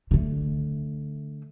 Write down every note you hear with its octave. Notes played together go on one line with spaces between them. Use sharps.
D3 A3